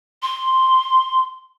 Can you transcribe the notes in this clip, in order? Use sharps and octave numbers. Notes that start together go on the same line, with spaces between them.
C6